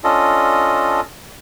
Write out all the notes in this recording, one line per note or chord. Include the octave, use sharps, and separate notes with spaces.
C#4 D4 F4 A4 D#5